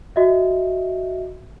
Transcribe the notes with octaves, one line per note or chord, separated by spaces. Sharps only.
F#4 D#5 E5